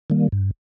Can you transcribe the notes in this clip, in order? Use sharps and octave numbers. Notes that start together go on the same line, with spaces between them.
D#3 G3 A#3
G2